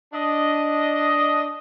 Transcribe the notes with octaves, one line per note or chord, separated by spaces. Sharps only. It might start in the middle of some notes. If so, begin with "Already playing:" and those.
D4 D#5